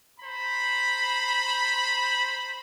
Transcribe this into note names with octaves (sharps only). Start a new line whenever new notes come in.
C5 A#5 B5